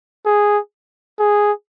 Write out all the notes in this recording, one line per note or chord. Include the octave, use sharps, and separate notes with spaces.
G#4
G#4